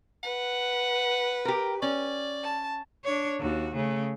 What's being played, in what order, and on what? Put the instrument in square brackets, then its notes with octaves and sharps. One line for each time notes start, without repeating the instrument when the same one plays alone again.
[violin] B4 [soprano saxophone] F#5
[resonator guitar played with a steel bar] G4 A#4
[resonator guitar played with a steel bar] C#4 [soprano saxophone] D5
[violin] A5
[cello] D4 C#5
D#2 F#4
C#3 A3